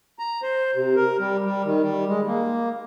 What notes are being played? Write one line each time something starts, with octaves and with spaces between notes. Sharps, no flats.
A#5
C5
C3
A#4
G3
G3
D#3
G3
G#3
A#3